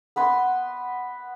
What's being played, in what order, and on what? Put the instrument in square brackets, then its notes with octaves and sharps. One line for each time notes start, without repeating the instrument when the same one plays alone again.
[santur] B3 B4 C6